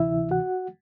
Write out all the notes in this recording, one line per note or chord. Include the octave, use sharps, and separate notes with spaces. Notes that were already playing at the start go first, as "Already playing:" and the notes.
Already playing: D2 C3 E3 E4 E5
F#4 F#5